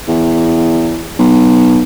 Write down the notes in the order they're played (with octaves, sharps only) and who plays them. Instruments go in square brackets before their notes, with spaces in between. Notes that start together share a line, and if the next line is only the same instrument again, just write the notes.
[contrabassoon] E2
B1